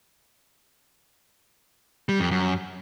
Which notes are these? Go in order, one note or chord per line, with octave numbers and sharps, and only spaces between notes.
G3
F2
F#2